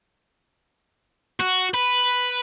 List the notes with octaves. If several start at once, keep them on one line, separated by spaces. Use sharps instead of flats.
F#4
B4